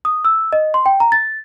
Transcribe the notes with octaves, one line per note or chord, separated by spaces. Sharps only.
D#6
E6
D#5
C6
G5
A#5
A6